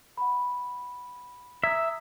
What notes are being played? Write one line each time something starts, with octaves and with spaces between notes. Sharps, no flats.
F#5 B5
E5 A#5 D#6 G#6